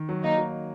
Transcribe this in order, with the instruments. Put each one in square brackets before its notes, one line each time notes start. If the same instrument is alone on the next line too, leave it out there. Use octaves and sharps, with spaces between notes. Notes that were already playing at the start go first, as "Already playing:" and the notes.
Already playing: [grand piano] D#3
F#3
[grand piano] A#3 [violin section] D#4
[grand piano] F#3